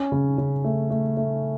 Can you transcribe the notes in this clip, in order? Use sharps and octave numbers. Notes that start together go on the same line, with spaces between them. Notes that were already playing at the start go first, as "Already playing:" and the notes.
Already playing: C#4
C#3
C#3
A3
A3
A3